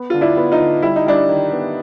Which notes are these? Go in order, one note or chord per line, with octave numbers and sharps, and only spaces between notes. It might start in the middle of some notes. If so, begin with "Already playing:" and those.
Already playing: B3
D3 F4
D4 E4
B3
D#4 F4
D3
G3 E4
D#4
G3 D4 E4
D#3
B3